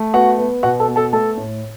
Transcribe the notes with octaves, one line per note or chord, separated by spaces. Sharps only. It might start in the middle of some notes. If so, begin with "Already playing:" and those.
Already playing: A3
B3 F#4 F#5
B3
B2 F#4 F#5
A4 A5
B3
A4 A5
A3 A4 A5
A2